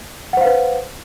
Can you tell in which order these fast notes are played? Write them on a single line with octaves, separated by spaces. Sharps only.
F#5 C5 F5 B4